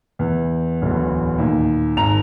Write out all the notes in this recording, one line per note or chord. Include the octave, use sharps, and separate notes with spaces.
E2
D1 E2
D#2 A#2
G#1 A#5 F7